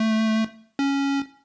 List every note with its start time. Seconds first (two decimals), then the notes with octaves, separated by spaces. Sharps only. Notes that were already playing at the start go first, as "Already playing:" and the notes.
Already playing: A3
0.79 C#4